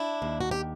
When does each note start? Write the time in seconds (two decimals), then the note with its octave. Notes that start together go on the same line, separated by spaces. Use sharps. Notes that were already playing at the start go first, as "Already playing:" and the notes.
Already playing: D4 E4
0.22 D#2
0.41 F#4
0.51 G4